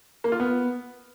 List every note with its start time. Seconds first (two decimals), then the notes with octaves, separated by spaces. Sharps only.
0.24 A#3
0.32 F4
0.40 B3